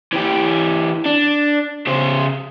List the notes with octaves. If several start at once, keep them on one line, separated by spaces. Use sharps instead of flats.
E3 G4
D4
C#3 C5